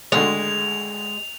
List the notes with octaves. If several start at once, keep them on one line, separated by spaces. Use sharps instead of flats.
G#1 D2 D3 G#3 F7